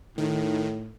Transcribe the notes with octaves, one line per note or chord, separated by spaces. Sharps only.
A2 D#3